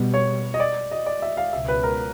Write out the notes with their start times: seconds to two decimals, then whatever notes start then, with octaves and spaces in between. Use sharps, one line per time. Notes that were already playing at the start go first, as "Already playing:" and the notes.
Already playing: B2 G3 B3
0.14 C#5
0.54 D#5
0.60 D5
0.91 D#5
1.06 D5
1.22 E5
1.37 F5
1.53 C#2 B2 F#3 E5
1.68 B4
1.83 A#4